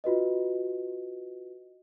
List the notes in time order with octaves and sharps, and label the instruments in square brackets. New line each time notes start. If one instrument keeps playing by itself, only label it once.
[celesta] F4 F#4 B4 D#5